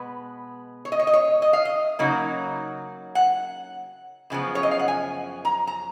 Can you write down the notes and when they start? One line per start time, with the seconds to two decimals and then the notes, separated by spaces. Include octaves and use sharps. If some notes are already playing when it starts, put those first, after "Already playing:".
Already playing: B2 G#3 B3 B4
0.85 C#5
0.92 D#5
0.99 C#5
1.07 D#5
1.13 C#5
1.42 D#5
1.53 F5
1.65 D#5
1.99 C#3 F#3 A#3 D#4
3.15 F#5
4.30 F#2 C#3 F3 B3
4.55 C#5
4.63 D#5
4.71 F5
4.79 F#5
4.88 G#5
5.45 A#5
5.67 A#5